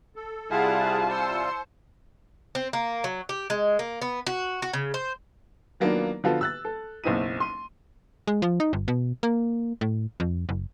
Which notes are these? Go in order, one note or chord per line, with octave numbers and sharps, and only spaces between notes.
A4
C3 G3 E4 F4 G#4 F5 F#5 A5
C5 C6 E6 C#7
C4
A#3
F#3
G4
G#3
A#3
B3
F#4
F#4
C#3
C5
D#3 F#3 A#3 B3 D4 F4
D3 F3 B3 F4 F#4 A4
E6 F#6 A6
A4
F#1 B1 C4 E4 D#5 D#7
C6 D#7
G#3
F3
D#4
G1
B2
A#3
A2
F2
F#1